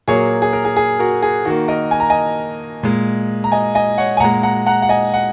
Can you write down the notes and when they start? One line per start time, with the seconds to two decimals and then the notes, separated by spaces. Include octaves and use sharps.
0.08 A#2 F#3 A#3 G#4 C#5
0.42 G#4
0.53 A#4
0.65 G#4
0.76 G#4
0.99 F#4 A#4
1.22 G#4
1.45 D#3 A#3 F#4
1.68 A#4 D#5
1.91 G#5
2.00 A#5
2.10 D#5 G#5
2.83 A#2 G#3
3.44 A#5
3.52 D#5 G#5
3.75 D#5 G#5
3.98 C#5 F#5
4.17 G#5
4.20 A#2 G#3 F#5 A#5
4.43 F#5 A#5
4.66 F#5 A#5
4.82 F#5
4.89 D#5 G#5
5.14 F#5